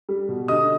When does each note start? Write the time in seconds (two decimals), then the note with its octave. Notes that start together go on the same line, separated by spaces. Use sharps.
0.09 G3
0.29 B2
0.48 D3 D#5 D#6